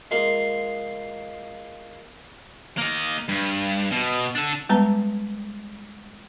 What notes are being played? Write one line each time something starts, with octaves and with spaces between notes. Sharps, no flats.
G#3 A#3 F4 C6
A#3 D#5
G2
B2
D4 A4
G3 G#3 B3 B4 A5 A#5